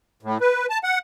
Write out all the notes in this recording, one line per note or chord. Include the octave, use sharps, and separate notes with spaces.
A2
B4
A5
F#5